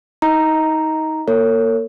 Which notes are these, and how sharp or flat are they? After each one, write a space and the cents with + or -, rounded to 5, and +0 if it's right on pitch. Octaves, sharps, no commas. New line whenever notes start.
D#4 +25 D#5 +20 A#5 +0
A#3 +5 A#4 -45 C#5 +0